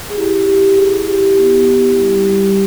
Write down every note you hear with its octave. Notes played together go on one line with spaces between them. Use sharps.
G#4
E4 G4
E4 G4
E4 G#4
E4 G4
B3
E4
G3
G3